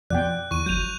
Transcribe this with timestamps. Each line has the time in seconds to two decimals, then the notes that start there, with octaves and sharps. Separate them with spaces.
0.10 F2 B2 D5 F#5 G5 F#6
0.51 E2 C#6 D#7
0.66 G1 F#3 G6 D#7 F7